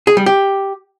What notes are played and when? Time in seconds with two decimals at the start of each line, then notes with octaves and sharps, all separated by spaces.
0.07 G#4
0.17 G3
0.26 G4